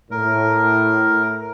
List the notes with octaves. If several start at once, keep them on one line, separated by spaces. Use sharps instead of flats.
A2 A#4